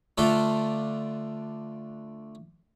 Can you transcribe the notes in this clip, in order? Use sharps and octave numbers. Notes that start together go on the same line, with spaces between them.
D3 A3 D4 F4 A4